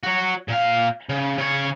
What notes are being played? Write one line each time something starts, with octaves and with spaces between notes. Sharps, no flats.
F#4 C#5
A#2 F5
C#3
C#3 C#5